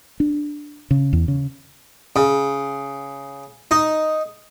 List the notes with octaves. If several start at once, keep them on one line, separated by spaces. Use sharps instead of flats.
D4
C#3
E2
C#3
C#3
D#4